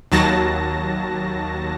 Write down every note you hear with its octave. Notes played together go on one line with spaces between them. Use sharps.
D#2 F#3 A5 A#6